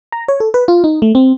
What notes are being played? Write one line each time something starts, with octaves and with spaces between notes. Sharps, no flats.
A#5
C#5
A4
B4
F4
D#4
A3
C4